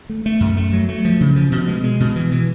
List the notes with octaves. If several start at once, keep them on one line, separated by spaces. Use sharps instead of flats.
A3
A3
F#2
A3
F#3
A3
F3
C#3
F3
B2
G#3
G#3
B2
E3
E3